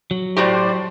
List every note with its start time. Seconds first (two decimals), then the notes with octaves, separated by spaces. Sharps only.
0.11 F#3
0.37 A2 F#4 G4 C5 D5